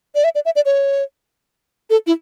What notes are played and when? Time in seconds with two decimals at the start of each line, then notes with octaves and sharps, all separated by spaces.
0.15 D5
0.24 E5
0.35 D5
0.45 E5
0.56 D5
0.66 C#5
1.90 A4
2.07 E4